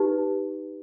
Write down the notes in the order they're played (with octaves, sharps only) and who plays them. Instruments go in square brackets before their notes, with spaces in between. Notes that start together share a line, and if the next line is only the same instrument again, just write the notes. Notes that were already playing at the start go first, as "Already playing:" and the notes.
Already playing: [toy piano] D#4 G4 B4